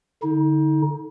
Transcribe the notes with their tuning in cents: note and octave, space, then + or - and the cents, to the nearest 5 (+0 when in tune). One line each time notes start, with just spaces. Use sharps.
D3 +0 D#4 +30